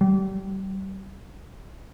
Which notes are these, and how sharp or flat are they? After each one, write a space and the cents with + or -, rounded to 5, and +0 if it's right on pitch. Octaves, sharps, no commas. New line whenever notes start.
G3 -30